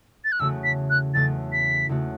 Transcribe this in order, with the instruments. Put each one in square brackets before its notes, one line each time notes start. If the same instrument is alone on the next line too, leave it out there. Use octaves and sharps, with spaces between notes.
[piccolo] A6
F#6
[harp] E2 C#3 A3 F#4 [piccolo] E6
[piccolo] B6
F#6
[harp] E2 C#3 A3 F#4 [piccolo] A6
[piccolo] B6
[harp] E2 C#3 A3 F#4